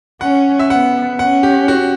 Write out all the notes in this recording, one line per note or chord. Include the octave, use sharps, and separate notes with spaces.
C#4 F#5
E5
B3 F#5
C#4 F#5
G4
F#4